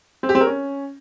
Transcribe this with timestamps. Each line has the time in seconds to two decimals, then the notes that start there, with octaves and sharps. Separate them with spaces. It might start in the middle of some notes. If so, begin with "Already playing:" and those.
0.23 C4
0.29 G4
0.35 C4
0.41 A#4
0.47 C#4